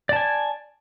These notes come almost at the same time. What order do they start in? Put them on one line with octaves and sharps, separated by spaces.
D5 A5 G#5